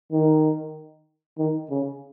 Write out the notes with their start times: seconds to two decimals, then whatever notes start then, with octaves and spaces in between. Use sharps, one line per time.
0.12 D#3
1.38 D#3
1.71 C#3